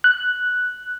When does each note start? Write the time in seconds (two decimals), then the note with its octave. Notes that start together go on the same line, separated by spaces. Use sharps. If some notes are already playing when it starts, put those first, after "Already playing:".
0.04 F#6